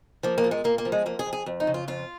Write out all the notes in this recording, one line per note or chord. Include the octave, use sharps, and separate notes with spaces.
F3 A#3
A#3
A#2
G#3
A#2 A#3
A#3
F3
G#3
F2 A#3
G#4
F2
G#4
F2
D#4
C#3
F4
F2 F4